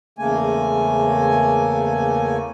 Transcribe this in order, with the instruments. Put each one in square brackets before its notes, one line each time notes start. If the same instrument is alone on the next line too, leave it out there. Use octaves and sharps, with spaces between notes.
[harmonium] E2 C#3 A3 A#3 G#5